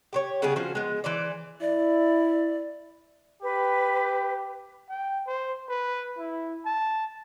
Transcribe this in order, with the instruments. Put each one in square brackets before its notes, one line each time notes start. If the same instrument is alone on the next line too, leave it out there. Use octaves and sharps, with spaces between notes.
[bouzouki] G4 C5 C#5
C#3 G3 B3 G#4
F3 C#4 F#4 C5
G#3 B3
E3 C5 D5
[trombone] E4 [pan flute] D5
[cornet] G4 [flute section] B4
[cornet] G5
C5
B4
E4
A5